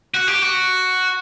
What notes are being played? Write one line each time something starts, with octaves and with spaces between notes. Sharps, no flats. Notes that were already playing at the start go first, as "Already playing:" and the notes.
F#4
G4
F#4